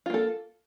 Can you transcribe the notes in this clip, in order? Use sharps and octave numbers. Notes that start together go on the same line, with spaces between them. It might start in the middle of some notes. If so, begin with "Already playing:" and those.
A#3 F4 A4